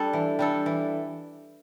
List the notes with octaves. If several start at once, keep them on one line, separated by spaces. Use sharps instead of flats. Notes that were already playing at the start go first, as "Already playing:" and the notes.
Already playing: G3 D4 A4
E3
G3 D4 A4
E3